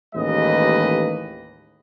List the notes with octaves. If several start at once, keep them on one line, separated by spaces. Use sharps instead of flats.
A1 D#2 G#3 B4 D#5